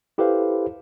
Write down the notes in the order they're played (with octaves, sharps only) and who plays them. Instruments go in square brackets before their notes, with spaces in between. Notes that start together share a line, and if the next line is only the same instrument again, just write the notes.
[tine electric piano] E4 G4 A4 B4 C5 F5